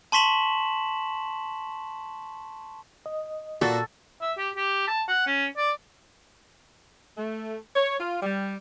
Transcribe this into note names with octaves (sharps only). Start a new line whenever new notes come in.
A5 C6 C#6 B6 E7 F#7
D#5
A#2 F#4 A4
E5
G4
G4
A5
F#5
C#4
D5
A3
C#5
F4
G3